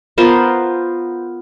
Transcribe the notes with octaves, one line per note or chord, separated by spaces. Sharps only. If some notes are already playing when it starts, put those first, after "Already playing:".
B3 F4 A#4 C5